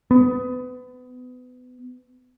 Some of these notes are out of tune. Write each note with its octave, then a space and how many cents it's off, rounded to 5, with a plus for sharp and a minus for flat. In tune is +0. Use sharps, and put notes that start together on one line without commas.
B3 +30